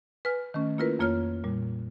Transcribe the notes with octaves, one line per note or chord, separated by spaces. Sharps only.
B4 G#5 F6
D#3 A3 C#4
A#3 E4 F4 A#4 B4
F2 A#3 F4 C#5 F6
A#2 G3